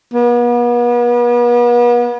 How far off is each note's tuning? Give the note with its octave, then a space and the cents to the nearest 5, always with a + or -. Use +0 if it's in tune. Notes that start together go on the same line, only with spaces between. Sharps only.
B3 -40